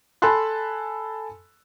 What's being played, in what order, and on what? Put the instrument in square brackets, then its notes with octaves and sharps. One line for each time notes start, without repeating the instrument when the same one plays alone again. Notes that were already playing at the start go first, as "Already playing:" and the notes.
[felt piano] A4 G#5 A5 B5 C6 F#6